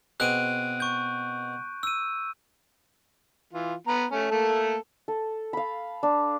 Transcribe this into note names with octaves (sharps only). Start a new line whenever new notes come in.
B2 C4 G#4 F#6 D7 D#7
C#6 G6
E6 D#7
E3 F4
B3 A#5
A3 C#4
A3 A#3 A4
A4
F5 B5
D4